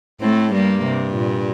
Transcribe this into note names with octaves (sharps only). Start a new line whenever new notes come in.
A2 A3 C4
G2 G3 A#3
C3
A#2